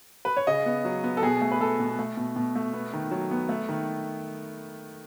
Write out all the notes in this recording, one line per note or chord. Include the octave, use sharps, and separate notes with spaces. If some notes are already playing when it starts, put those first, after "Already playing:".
B4
C#5
C#3 D#5
B3
F#3
B3
A4
B2 G#4
A3
B4
A3 A4
B2
A3
B2
B2
A3
B3
D#3
F#3
B3
A3
D#3